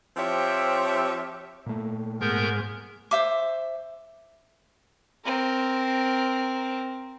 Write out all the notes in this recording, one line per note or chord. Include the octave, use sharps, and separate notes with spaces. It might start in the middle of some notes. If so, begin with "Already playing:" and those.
F3 C4 G4 C#5 E5
A#2 A3
G#2 B3 A#4 G6
C5 E5 D6
C4 A#4